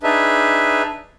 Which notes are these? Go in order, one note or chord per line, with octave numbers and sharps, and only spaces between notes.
D4 D#4 G#4 B4 E5